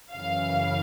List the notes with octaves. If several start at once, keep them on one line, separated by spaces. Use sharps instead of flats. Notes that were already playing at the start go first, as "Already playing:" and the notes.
F#2 C#3 E3 F5